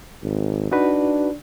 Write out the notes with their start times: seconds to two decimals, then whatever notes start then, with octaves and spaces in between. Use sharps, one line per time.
0.22 G#1
0.72 D4 D#4 F#4 B4